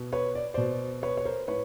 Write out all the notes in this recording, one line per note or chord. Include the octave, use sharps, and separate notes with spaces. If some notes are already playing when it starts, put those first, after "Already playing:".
Already playing: B2
B4 C#5
D5
B2 C5 D5
B4 C#5
C#5
A#4 C5
A2 B4 C#5